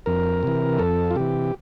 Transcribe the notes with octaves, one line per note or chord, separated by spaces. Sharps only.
F2 A#4
C3 E3
F2 A4
F4
C3 E3 G4